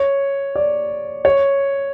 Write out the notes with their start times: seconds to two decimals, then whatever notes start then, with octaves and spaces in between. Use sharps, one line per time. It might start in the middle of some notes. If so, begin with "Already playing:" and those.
Already playing: C#5
0.56 D5
1.25 C#5